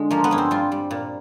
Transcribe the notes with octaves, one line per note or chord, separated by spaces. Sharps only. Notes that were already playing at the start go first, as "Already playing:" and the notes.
Already playing: D3 G#3
F3 A#3
B3
G2 C#4
C4
G3 F4
G3
A#2